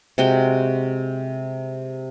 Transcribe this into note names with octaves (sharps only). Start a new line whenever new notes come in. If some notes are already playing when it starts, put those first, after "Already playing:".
C3 G#3 F#4 G5